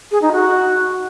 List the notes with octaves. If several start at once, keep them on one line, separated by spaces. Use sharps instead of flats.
G#4
D#4
F#4